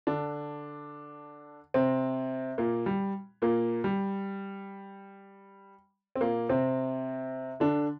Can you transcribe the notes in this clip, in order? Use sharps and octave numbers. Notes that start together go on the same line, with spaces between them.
D3 D4
C3 C4
A#2 A#3
G3
A#2 A#3
G3
C4
A#2 A#3
C3 C4
D3 D4